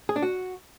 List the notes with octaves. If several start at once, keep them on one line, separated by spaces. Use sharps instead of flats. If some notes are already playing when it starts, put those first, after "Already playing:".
G#4
D4
F#4